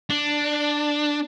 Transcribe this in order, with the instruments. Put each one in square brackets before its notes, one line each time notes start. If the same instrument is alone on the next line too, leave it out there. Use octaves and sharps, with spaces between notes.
[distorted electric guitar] D4